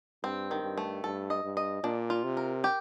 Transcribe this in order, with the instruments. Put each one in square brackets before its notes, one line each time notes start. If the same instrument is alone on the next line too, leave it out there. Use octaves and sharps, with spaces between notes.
[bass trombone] G2 [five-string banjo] C4
[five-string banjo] D#3
[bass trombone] G2
[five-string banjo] A3
[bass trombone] G2 [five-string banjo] A4
[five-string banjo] D#5
[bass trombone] G2
[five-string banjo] D#5
[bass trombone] A#2 [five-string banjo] D4
[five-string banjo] F4
[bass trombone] C3
[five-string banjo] A#4
G4